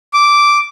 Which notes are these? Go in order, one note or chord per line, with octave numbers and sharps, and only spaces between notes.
D6